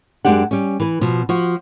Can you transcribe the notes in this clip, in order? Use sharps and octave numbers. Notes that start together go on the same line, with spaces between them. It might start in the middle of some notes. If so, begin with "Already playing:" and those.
F#2 E3 G#3 D4 G4 F#5
G3 C#4
E3 B4
B2 F3
F3 F#4